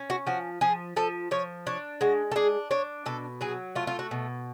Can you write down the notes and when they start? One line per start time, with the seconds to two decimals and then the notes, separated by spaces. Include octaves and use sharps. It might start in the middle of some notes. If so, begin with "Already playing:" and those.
Already playing: C#4
0.10 F#4
0.27 F3 F#4
0.61 F3 G#4
0.96 F3 A4
1.31 F3 C#5
1.67 D4 C#5
2.01 G#3 F#4
2.31 A4
2.36 D4 G#4
2.71 D4 C#5
3.06 B2 A4
3.41 F#3 G#4
3.75 A3 F4
3.87 F4
3.99 F#4
4.11 B2